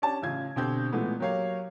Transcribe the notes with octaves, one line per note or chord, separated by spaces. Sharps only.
C#4 D4 G4 A5
A1 C#3 F4 G#6
B2 D3 C4 G4 G6
A#2 E3 G#3 A3 B3
F#3 A#3 G4 C#5 F5